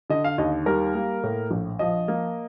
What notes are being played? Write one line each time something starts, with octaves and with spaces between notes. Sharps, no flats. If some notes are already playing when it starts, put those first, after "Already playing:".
D3 D#5
F5
D#2 D#5
G3 A#4
A#3
A2
A#1
F3 D#5
A#3